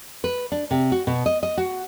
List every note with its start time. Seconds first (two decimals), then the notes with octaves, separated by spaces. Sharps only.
0.24 B4
0.52 D4
0.71 C3
0.92 F#4
1.07 B2
1.26 D#5
1.43 D#5
1.58 F#4